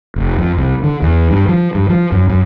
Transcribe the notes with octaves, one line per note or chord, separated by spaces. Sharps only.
F1
F2
C2
D3
E2
G2
F3
G2
F3
F#2
F#2